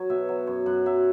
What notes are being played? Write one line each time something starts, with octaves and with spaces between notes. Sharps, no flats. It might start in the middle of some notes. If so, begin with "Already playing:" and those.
Already playing: F#3 C#5
B2 E5
F#3
F#2 C#5
F#2 F#5
F#3 E5